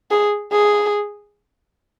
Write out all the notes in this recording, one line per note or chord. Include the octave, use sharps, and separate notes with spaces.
G#4
G#4